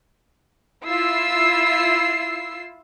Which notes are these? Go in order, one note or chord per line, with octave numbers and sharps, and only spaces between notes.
E4 F4 E6 C7